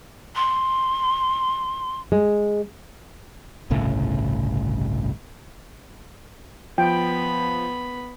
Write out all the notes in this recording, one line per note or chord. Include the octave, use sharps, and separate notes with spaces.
C6
G#3
G1 C2 A2 C#3
F3 B3 G5 B5